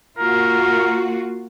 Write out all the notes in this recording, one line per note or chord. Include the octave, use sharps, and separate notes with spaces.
A#3 F4 F#4 A#4